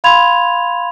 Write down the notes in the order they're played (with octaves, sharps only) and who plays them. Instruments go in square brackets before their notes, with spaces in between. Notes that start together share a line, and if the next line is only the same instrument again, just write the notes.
[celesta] F5 B5 C6 G#6 F7